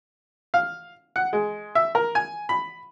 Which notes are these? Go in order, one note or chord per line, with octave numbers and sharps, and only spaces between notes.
F5
F#5
G#3
E5
A#4
G#5
B5